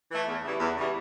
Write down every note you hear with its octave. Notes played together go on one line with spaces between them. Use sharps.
E3 A3
E2
C#3 E3 G3
E2
C#3 E3 G3